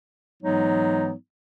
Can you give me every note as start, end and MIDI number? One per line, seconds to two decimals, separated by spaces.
0.42 1.13 44
0.42 1.13 52
0.42 1.13 54
0.42 1.13 56
0.42 1.13 59
0.42 1.13 63